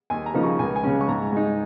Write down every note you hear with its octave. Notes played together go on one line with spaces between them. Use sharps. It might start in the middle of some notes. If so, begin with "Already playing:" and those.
D#2 G#5
A#5
C#3 F3 A#3 D#4
C#6
C#2 G#5
G#5
C#3 G#3 C#4
C#6
G#2 A#5
G#3 D#4